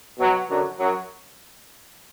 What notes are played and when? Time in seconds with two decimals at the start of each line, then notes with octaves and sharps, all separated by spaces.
0.19 B2 F#3
0.50 F#2 D3 F#3
0.79 F#2 F#3